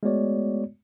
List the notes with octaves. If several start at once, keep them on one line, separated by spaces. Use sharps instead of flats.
G#3 A3 B3 F#4 C#5 D5